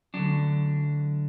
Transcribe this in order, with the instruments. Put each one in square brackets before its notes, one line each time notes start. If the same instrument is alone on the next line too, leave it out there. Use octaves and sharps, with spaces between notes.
[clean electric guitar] D2 D3 F#3 D4